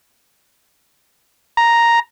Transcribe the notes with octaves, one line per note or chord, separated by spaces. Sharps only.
A#5